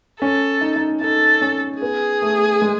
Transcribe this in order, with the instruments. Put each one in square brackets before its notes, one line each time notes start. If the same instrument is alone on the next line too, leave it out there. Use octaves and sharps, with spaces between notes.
[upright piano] C#4 [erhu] A4
[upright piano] D#4
D#4
[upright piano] D#4 [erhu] A4
[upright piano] C#4
[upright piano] B3 [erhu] G#4
[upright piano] A3
G#3